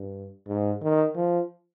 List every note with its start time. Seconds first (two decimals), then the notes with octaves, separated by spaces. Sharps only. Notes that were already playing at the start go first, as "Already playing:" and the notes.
Already playing: G2
0.48 G#2
0.82 D#3
1.16 F3